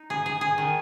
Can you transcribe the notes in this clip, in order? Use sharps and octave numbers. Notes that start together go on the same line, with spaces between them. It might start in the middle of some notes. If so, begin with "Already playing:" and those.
Already playing: D#4
G#4
G#4
G#4
D#3